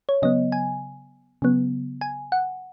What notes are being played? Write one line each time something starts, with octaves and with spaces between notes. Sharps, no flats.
C#5
C#3 F#3 B3 D#5
G#5
C#3 F#3 B3
G#5
F#5